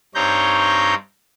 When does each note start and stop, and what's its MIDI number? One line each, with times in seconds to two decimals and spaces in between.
0.15 0.94 43
0.15 0.94 60
0.15 0.94 63
0.15 0.94 73
0.15 0.94 82
0.15 0.94 91